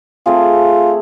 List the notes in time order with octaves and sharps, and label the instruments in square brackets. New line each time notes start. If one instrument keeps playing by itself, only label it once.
[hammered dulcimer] A3 C4 G#4 [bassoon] F4